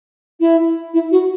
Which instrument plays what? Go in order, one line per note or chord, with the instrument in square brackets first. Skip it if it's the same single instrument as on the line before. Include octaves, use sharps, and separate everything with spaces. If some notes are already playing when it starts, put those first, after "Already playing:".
[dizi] E4
E4
F#4